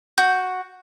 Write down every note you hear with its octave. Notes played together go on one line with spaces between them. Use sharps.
F#4 G6